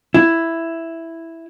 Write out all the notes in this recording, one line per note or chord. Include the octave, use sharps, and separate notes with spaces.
E4